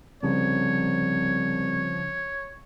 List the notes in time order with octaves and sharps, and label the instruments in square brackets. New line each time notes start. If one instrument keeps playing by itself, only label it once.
[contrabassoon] C2 [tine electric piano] C#3 [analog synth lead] F3 [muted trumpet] C#5